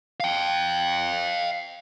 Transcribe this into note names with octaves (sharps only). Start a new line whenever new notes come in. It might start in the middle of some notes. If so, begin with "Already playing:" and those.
F5 G5